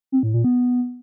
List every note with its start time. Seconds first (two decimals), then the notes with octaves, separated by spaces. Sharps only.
0.12 C4
0.23 A2
0.34 A#2
0.44 B3